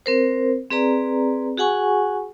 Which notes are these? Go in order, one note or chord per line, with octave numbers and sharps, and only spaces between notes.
C4 A#4 C5
C4 G#4 B4 D5 A#5
F#4 G#4 F#5 G#5 C#6